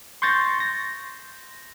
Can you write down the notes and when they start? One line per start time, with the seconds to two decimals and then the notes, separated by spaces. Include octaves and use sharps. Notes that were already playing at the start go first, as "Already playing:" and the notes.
0.22 C6 C#6 G6 A6 A#6
0.60 A#6